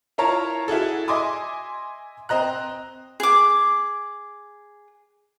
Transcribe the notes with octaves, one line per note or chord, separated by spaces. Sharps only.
E4 F4 A#4 C#5 A5 A#5
E4 F#4 G#4 A4
D#5 E5 G#5 C6 D6 D#6
C4 C5 D#5 A#5 F#6
G#4 D6